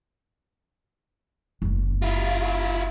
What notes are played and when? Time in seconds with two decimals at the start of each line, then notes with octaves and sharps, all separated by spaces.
1.62 F#1 C#3
2.02 E4 F4